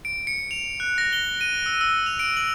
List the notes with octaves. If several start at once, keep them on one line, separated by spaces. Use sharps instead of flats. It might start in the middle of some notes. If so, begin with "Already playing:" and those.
D7
C#7
F7
F#6
A#6
G7
D#7
E6
E6
F7
D7
F#7